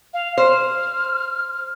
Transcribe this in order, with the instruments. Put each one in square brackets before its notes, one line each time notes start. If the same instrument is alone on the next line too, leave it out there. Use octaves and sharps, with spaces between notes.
[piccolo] F5
[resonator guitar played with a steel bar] C5 [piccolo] F6